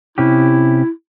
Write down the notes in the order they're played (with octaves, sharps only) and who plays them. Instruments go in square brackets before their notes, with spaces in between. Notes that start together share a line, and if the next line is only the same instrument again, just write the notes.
[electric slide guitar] C3 C#4 G4 [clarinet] E4